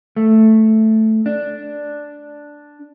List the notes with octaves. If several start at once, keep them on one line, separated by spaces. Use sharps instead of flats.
A3
D4